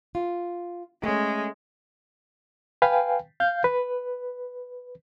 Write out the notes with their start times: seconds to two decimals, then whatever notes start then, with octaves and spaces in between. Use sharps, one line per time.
0.15 F4
1.04 G#3 A3 C#4
2.82 B4 F5 G5 G#5
3.40 F5 G6
3.64 B4